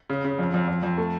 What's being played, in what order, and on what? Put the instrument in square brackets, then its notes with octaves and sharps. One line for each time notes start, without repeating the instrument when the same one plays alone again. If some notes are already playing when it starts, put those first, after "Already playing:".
[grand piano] C#3
C#3
F2
F2
F2
F2
A3